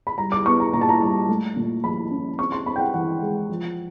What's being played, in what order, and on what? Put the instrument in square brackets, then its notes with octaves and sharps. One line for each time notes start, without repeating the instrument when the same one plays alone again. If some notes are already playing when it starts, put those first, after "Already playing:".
[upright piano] B5
G3 A#5
D6
B3 C#6
A#5
A#2 A#5
A5
A#5
G3
A3
A#2
F3 B5
C#4
C4 C#6
C6
C4 B5
G5
F#5
E3 F#5
G#3
F3